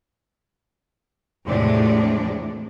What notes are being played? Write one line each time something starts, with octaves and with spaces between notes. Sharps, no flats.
E2 A2 C3 F3 G#3 D4